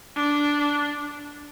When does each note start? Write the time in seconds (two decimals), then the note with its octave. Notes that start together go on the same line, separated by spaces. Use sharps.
0.16 D4